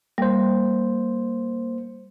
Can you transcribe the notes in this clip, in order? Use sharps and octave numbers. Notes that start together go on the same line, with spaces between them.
G3 A#3 C5